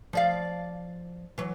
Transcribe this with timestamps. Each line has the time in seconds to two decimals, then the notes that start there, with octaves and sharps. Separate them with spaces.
0.13 F3 D5 F5
1.38 E3 F#3